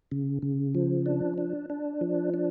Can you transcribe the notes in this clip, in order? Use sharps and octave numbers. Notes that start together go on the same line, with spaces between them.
C#3
C#3
F3
D4
D4
D4
F3
D4